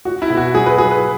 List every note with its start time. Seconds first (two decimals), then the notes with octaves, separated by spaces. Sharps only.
0.05 F#4
0.22 E4
0.30 B2
0.37 F#4
0.54 F#3 G#4
0.66 B4
0.78 F#3 G#4
0.91 B4